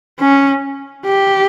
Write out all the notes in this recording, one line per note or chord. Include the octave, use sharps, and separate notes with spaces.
C#4
G4